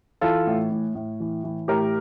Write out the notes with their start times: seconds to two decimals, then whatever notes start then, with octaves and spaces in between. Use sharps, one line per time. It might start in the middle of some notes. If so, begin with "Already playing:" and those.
0.21 E3 F4 A4
0.47 A2
0.71 A2
0.95 A2
1.20 E3
1.44 E3
1.68 A2 G4 A#4